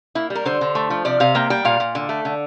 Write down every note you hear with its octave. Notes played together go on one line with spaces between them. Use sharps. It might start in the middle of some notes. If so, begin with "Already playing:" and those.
A#3 E4
G3
A#4
D3 C5
D3
A3
F3
C3 D5
C3 F5
A#3 G5
G3 G5
A#2 F5
A#2
D3
A3
D3